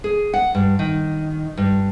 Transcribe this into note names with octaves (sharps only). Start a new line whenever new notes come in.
G#4
F#5
G2
D#3
G2